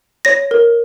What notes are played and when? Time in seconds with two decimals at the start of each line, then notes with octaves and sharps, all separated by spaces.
0.25 C#5 A#6
0.51 A#4